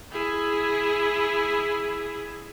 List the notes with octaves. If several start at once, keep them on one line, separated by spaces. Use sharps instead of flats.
E4 G#4